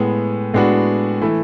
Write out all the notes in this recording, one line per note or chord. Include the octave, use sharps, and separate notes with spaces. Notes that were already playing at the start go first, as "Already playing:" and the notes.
Already playing: A2 G#3 B3
A2 G#3 B3 D4 F#4
E3 A3 E4